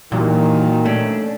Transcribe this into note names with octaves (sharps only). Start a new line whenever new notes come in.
G2 A#2 D#3 E3 F#3
A3 C#4 D4